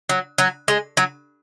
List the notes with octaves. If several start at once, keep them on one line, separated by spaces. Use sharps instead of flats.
F#3
F#3
G#3
F#3